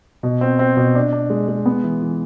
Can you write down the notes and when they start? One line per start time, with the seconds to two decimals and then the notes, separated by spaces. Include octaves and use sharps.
0.23 B2
0.41 C4
0.59 C4
0.77 B2
0.95 D4
1.13 D4
1.30 G#3
1.48 G#3
1.66 B3
1.84 E3
2.02 E3